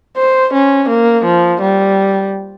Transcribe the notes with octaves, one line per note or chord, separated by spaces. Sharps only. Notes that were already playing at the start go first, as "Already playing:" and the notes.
C5
C#4
A#3
F3
G3